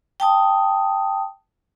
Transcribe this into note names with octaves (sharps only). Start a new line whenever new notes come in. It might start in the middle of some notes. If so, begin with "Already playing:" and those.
G5 A5 D#6